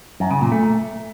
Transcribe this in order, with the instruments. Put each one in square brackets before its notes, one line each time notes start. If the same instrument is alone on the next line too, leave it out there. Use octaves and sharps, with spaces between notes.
[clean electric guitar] F#2
C#3
A#2
A3